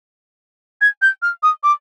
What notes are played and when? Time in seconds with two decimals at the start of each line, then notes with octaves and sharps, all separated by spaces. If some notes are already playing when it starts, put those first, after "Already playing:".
0.81 G#6
1.02 G6
1.22 F6
1.43 D#6
1.63 D6